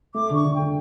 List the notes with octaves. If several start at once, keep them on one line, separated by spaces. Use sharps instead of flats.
A3 D6
D3 C#6
D3
D3 G5